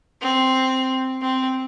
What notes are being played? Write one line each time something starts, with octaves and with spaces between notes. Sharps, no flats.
C4
C4